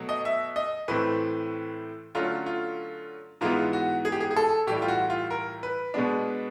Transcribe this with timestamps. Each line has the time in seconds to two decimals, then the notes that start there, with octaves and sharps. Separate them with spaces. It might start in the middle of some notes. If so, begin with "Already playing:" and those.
Already playing: B2 F#3 A3
0.09 D#5
0.25 E5
0.56 D#5
0.88 A2 E3 A3 C4 B4
2.15 D3 F#3 A3 C#4 F4
2.46 F4
3.41 G#2 E3 G#3 B3 F4
3.73 F#4
4.05 G#4
4.12 G4
4.20 G#4
4.31 G#4
4.36 A4
4.67 A2 E3 G3 G4
4.82 F4
4.88 F#4
5.10 F4
5.30 A#4
5.63 B4
5.94 B2 G#3 B3 D4